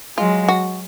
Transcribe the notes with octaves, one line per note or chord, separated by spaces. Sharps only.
F#3 G#3 F4
F#4